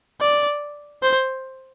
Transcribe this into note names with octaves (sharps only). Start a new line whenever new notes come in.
D5
C5